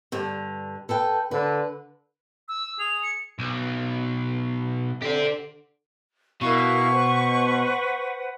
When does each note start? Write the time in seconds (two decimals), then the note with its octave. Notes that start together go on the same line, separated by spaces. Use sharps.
0.12 G2 D3
0.89 A4 B4 G5
1.31 D3 B4
2.48 E6
2.79 G#4 F7
3.03 C#7
3.39 B1
5.02 D3 G4 C5
6.41 B2 E4 A#4 F5 C#6
6.91 B4 C5 F#5